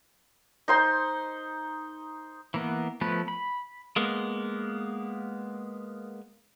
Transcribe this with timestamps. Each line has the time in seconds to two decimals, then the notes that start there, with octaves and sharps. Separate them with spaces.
0.68 D#4 C5 C6
2.54 E3 A#3 B3
3.01 F3 A3 B3 B4
3.28 B5
3.96 G#3 A#3 B3